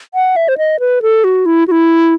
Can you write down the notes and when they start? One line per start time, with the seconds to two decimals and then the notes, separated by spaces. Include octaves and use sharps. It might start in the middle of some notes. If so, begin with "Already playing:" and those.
0.14 F#5
0.36 E5
0.48 C5
0.58 D#5
0.80 B4
1.02 A4
1.24 F#4
1.46 E4
1.68 F#4
1.71 E4